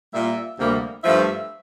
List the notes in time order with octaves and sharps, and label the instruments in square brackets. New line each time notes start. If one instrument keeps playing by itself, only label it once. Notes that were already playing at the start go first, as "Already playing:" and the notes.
[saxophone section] A#2 G3 A#3 E5
D2 C3 G3 A#3
G2 F3 A3 E5